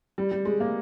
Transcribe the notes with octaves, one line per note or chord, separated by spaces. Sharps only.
G3
G3
G#3
A#3